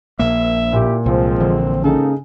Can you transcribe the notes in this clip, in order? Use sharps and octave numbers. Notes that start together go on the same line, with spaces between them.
A#1 A#3 E5
A#2 E4 G4
C2 F3 G#3 C4
A#1 D3 E3
G#2 C#3 A#3 D#4 A4